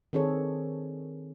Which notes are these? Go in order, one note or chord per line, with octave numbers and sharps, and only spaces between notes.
D#3 C4 D4 G#4 A4 C#5